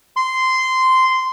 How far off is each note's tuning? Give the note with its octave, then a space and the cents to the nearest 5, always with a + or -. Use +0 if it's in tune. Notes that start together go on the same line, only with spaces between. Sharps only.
C6 -10